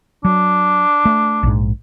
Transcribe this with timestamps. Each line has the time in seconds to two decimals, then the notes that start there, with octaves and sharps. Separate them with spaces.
0.25 F#3 D4
1.05 A3
1.43 A#1 G#2